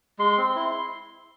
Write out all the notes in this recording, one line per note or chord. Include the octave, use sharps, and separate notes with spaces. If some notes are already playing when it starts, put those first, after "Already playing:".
G#3 C6
C4
E4